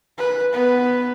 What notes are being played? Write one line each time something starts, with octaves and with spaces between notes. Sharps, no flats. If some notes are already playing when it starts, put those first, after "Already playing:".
B4
B3 B4